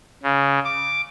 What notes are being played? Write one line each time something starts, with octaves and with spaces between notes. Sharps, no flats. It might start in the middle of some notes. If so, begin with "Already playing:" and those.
C#3
D6